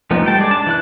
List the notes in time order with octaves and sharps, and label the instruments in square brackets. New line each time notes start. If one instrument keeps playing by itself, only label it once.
[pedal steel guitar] F3 A3 B3 D#4
G3 G5 A5
G#3 D5
D4 A5
E3 E4 F#6